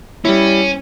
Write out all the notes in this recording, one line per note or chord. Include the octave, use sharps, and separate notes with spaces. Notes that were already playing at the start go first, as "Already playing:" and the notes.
G3 C#4 E4